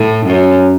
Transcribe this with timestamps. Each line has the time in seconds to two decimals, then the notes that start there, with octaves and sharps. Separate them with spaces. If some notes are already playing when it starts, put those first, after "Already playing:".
Already playing: A2
0.26 F#2 C#4